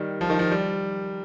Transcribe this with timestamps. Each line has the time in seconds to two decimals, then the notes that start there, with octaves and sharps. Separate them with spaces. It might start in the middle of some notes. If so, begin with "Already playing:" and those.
Already playing: D#3 G3
0.21 F3
0.30 D#3
0.39 F3
0.51 G3